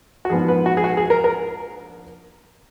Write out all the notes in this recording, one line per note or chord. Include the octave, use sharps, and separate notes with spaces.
F#4
A#1 G#2 F3 B3 G#4
B4
F#4
G#4
F#4
G#4
A#4
A#4